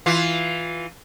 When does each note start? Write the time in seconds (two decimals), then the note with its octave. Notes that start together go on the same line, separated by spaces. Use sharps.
0.06 E3 F4